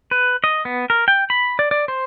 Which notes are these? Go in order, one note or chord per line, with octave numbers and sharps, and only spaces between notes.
B4
D#5
B3
A#4
G5
B5
D5
D5
C5